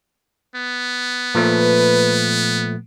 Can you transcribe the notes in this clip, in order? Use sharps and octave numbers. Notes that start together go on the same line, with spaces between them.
B3
A#2 F3 A3 B4